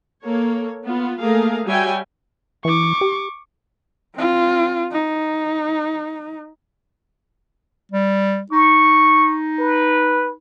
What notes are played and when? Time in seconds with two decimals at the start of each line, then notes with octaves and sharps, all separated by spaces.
0.24 A#3 A4 C#5
0.84 B3 F4
1.19 A3 A#3 G#4 A#4 F5
1.67 G3 F#4 C#5 E5 G5 G#5
2.65 E3 C#6 D6
3.01 G4
4.15 C4 F4
4.92 D#4
7.92 G3
8.52 D#4 C#6
9.59 B4